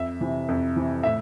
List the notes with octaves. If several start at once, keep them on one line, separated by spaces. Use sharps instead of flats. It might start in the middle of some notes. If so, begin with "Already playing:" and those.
Already playing: F2 E5
C3 E3
F2
C3 E3
A2 E5